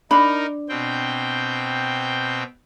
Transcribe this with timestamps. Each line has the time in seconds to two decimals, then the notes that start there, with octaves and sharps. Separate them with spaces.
0.11 D4 D#4 A#4 B5
0.69 B2 C4 G5